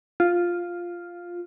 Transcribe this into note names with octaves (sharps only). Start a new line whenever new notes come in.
F4